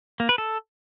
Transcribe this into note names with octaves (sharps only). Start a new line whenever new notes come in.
A#3
B4
A4